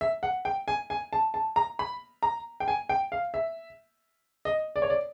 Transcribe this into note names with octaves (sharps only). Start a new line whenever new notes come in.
E5
F#5
G5
G#5
G#5
A5
A5
A#5
B5
A#5
G5
G#5
G5
F5
E5
D#5
D5
C#5
D5